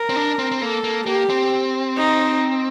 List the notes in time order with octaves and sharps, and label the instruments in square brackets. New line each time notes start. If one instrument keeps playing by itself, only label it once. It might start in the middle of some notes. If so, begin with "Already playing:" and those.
Already playing: [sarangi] A#4
[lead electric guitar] C4
D4
C4
C4
[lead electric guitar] A#3 [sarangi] A4
[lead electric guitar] A#3
[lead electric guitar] A#3 [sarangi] G4
[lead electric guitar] C4
[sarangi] D#4